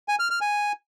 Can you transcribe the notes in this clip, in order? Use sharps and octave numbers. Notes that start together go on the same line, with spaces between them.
G#5
F6
F6
G#5